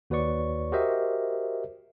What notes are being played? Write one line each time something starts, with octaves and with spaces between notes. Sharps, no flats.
D#2 F#4 B4 C#5 D5 C#6
F#4 G4 A#4 C5 D#5 E5